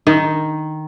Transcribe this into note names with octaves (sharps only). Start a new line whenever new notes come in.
D#3